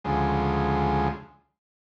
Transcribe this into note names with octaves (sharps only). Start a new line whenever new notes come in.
D2 C#3 F3 G#3